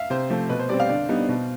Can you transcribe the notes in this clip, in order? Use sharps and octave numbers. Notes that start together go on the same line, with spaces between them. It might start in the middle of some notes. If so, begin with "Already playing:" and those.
Already playing: E5 F5
C3 C5
F3 A3
B2 B4
C5
G3 C4 D5
F5
D3 D5
G3 B3 D#4
B2